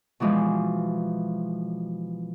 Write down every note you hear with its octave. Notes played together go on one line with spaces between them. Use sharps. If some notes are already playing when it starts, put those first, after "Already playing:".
B2 E3 F3 G#3